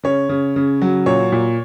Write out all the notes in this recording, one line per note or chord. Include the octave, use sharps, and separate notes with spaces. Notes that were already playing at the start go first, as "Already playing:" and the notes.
C#3 C#5
C#3
C#3
F#3
A#2 C#5
A#2